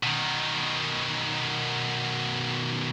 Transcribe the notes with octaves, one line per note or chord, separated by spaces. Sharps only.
B2 D#3